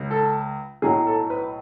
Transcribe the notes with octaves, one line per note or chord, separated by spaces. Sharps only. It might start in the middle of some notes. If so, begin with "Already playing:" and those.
Already playing: C#2 C#3
A4
B1 A2 F#3 G#4
A4
B4